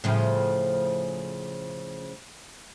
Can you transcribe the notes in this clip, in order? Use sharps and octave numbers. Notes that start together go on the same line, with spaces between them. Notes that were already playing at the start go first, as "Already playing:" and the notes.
A2 C#3 F3